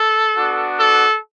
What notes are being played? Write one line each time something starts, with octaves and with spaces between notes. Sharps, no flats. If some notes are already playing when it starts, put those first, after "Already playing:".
Already playing: A4
B3 D4 F#4
A4